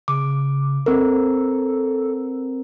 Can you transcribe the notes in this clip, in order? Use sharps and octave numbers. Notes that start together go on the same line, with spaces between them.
C#3 D6
C4 A4 A#4